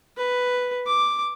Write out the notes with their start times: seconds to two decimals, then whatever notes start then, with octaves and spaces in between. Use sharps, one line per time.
0.17 B4
0.87 D6